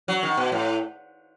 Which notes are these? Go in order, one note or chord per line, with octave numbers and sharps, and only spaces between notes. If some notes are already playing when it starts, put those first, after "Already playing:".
F#3
D#3
B2
A2